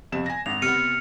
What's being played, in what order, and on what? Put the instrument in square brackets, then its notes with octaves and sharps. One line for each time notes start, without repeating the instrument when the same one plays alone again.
[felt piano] F2 C3 E7
G#5 A#6
[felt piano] G#1 [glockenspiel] F7
[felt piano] C3 B3 [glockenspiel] F6 C#7 D#7